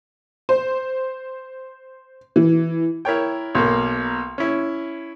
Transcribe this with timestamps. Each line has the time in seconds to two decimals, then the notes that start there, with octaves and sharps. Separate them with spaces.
0.49 C5
2.36 E3
3.05 E4 A#4 C#5 G5
3.55 B1 B2 A#3
4.38 C#4 E4